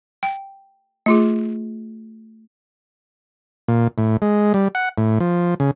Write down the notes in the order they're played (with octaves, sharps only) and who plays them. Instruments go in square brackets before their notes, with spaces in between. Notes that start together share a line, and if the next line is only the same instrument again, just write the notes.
[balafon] G5
A3 F4 G#4
[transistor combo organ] A#2
A2
G#3
G3
F#5
A2
F3
C#3